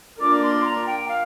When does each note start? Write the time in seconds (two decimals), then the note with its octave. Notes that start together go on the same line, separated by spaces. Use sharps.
0.21 A#3 D4 F4 A#4 D5 D6
0.42 C6
0.65 A#5
0.86 G5
1.08 F5